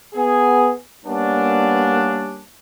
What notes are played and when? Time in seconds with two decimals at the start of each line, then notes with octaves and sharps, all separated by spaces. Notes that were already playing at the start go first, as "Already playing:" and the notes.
0.14 B3 G#4
1.05 G3 A#3 B3 C#4 D4